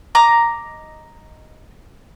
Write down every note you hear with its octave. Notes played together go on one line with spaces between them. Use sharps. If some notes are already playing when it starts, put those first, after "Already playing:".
D#5 A#5 D6